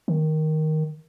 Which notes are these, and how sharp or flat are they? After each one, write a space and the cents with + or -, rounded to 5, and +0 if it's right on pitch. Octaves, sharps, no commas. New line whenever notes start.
D#3 +5